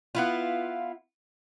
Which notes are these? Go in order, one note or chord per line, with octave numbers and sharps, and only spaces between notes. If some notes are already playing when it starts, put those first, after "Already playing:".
B3 E4 F4